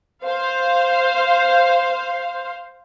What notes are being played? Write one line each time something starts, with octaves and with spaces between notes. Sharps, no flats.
C5 F5